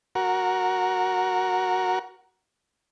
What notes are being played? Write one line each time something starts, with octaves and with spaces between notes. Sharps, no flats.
F#4 A#4